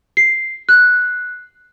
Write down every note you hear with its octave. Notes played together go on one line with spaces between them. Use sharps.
C7
F#6